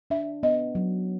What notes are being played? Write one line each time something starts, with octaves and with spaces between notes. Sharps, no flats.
D4 E5
B3 D#5
F#3